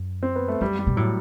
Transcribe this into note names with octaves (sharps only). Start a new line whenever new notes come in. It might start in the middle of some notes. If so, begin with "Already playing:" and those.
Already playing: F#2
C4
B3
A3
F#2 G3
G3
B2
A2 F#3